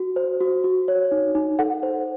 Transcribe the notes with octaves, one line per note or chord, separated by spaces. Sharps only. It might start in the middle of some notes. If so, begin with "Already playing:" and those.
Already playing: F#4
C5
F#4
F#4
C#5
D#4
D#4
A4 F#5
C5